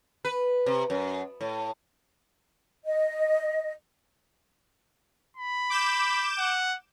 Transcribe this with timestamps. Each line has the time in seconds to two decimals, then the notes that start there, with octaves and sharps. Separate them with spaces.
0.25 B4
0.66 C3
0.90 F#2
1.41 A2
2.85 D#5
5.37 B5
5.70 D6 G6 E7
6.38 F#5